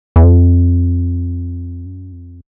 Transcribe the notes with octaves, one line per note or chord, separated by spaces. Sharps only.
E2
F2
F#2
F2